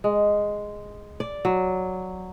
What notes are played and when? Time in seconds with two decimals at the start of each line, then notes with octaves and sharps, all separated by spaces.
0.04 G#3
1.20 D5
1.45 F#3